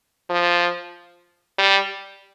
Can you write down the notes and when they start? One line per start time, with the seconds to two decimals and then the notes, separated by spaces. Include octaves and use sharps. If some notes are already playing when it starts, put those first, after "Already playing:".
0.30 F3
1.58 G3